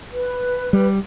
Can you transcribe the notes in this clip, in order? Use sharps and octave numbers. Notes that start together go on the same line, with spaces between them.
B4
G3